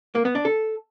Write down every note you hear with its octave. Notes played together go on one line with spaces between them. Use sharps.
A#3
B3
D4
A4